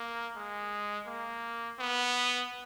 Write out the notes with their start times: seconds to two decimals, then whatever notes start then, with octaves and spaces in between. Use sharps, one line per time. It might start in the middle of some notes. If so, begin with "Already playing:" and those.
Already playing: A#3
0.36 G#3
1.07 A#3
1.79 B3